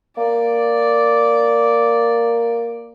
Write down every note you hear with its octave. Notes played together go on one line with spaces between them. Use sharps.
A#3 D5